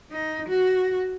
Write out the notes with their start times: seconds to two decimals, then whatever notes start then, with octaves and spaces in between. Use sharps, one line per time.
0.11 D#4
0.48 F#4